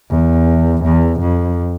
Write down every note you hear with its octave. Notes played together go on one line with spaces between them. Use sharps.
E2
E2
F2